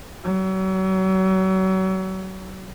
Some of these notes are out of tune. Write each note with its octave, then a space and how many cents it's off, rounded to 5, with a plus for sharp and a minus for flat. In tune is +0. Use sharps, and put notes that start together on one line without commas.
F#3 +35